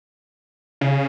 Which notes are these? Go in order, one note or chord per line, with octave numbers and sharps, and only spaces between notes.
C#3